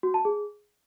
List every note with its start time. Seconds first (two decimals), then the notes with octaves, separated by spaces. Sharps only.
0.03 F#4
0.14 A5
0.25 G#4